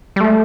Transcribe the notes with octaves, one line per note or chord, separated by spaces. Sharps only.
G3
A3